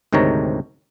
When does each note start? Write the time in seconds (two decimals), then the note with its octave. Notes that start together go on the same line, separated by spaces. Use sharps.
0.13 D2 G#2 C3 D#3 C#5 A#5